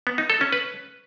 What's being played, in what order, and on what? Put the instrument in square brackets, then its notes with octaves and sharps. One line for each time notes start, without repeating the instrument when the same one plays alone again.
[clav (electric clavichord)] B3
D#4
A4
C#4
B4